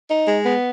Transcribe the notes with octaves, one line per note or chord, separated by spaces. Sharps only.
D#4
G#3
B3